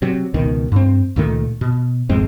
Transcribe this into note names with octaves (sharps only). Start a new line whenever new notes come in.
C3 F#3
C#2 B2 D#3
G2 C4
C#2 A#2 D#3 A3
B2
G#1 F2 G#3 C4